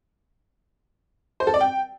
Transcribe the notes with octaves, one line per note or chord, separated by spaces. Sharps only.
C5
A4
D5
G5